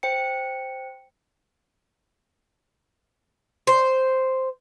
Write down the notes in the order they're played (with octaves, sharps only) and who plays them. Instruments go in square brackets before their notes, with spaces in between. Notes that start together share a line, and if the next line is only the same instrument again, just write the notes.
[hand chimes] C5 G5 C#7
[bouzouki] C5